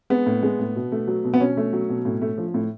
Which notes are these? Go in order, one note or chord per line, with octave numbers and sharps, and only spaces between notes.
G#3 B3
A2
G#3
A2
B2
A3
F#3
B2
B3
B2 C#4
A3
F#3
B2
A2
A3
F3
A2